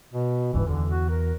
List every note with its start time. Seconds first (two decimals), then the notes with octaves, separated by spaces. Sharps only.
0.13 B2
0.53 D#1 C#2 G2 E3
0.67 E2 D3
0.91 F#4
1.09 A#4